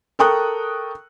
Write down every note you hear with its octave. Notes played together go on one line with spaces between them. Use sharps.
A4 A#4 G5 C#6 D#6 F#6